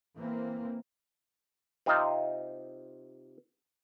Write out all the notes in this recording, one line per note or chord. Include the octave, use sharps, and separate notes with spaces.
E3 A#3 C4
C3 C4 D#4 F4 D#5 F5